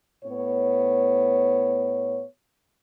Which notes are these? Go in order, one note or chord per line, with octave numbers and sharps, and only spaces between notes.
A2 B3 C#5